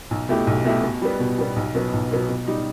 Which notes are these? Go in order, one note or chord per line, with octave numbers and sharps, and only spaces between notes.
B1
B2 A3 E4 G4
B1
B2 A3 E4 G4
B2
G3 B3
B2
G3 B3
B1
B2 F#3 B3
B1
B2 F#3 B3
B2
G3 D#4 G4